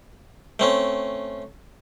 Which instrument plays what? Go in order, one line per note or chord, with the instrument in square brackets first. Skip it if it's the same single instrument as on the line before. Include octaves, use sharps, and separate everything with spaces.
[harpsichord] A3 C4 C#4